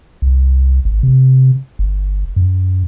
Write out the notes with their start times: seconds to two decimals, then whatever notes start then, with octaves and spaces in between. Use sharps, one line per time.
0.22 C2
0.85 G#1
1.03 C3
1.79 G1
2.36 F#2